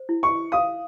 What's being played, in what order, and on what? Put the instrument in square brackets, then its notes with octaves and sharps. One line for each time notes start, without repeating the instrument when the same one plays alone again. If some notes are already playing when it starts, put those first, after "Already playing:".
Already playing: [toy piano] C5
E4
[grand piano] C#6
[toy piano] F5 [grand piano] D#6